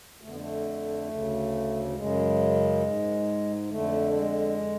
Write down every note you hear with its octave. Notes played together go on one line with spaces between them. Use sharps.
F2 D3 A3 B3
A3
D2 C#3
F#2 C#3 G#3
G#2
F2 D3 A3
G#3